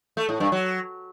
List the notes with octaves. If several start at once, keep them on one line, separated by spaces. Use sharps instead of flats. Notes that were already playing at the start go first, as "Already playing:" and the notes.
A3
A2
G2
F#3